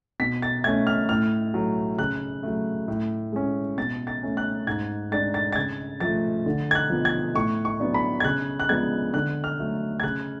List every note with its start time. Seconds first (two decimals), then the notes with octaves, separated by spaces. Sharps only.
0.20 B2 B6
0.42 A6
0.64 A3 C#4 G#6
0.87 F6
1.09 A2 F6
1.54 F#3 A3
1.99 C#3 F#6
2.43 F#3 A3
2.88 A2
3.32 G#3 C#4
3.77 B2 A6
4.07 A6
4.23 A3 C#4
4.37 F#6
4.67 G#2 G#6
5.12 G#3 D4 A6
5.34 A6
5.52 A6
5.56 C#3 G#6
6.00 F3 A3 A6
6.46 D3
6.71 G#6
6.75 F#6
6.90 F3 B3
7.05 G#6
7.35 A2 C#6
7.65 C#6
7.80 F#3 B3 D4
7.94 B5
8.20 G#6
8.24 C#3 F#6
8.60 F#6
8.69 F3 G#3 B3 D4 G#6
9.14 D3 F#6
9.44 F6
9.59 F#3 A3
10.00 G#6
10.03 C#3 F#6